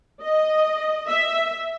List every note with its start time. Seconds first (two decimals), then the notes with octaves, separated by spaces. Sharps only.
0.22 D#5
1.08 E5